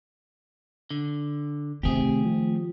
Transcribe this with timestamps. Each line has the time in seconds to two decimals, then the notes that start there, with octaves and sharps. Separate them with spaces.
0.91 D3
1.83 C3 D#3 A3 G4 G#4
2.25 F3